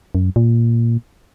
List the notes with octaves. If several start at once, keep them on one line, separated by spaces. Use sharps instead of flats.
F#2
A#2